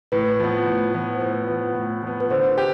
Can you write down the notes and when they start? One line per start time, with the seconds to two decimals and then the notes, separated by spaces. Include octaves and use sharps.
0.12 A2 B4
0.40 F3 B3
0.66 A2
0.94 F3 B3
1.15 C5
1.21 A2 B4
1.48 F3 B3
1.75 A2
2.03 F3 B3
2.20 B4
2.30 D3 C5
2.58 G4